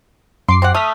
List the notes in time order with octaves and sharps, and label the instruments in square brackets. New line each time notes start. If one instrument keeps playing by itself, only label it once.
[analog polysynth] F#2 D6 C7 [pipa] C6
[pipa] C4 G4 F#5
[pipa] A3 [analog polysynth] D#6 F6 B6